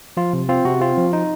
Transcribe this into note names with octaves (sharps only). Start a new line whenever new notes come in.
F3 F4
C3
C4 F4
C3 F#4
C4 F4
F3
D#4